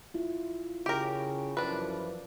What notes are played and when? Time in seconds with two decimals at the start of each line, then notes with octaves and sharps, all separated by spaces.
0.14 E4 F4
0.86 C#3 E4 G4 A#4
1.57 F#2 E3 F3 D4 B4